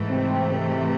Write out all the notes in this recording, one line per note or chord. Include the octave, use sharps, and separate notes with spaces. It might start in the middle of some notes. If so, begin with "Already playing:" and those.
Already playing: G#2 E3 A3
C3 C4
C3 C4